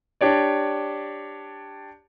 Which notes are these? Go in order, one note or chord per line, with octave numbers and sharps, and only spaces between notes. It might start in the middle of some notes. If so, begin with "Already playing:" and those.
D4 G4 C#5 D5